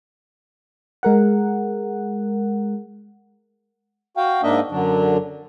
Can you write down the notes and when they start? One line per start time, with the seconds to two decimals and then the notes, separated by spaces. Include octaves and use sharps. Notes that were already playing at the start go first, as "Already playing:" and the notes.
1.03 G#3 A#4 F#5
4.17 F#4 F5 G5
4.43 G#2 A#3 D4 D#5 E5
4.72 F#2 D3 F#3 D4